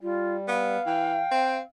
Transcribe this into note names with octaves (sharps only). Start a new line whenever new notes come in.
G3 F4
B3 F5
E3 G5
C4